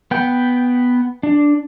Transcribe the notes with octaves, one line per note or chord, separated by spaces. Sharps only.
B3 G5
D4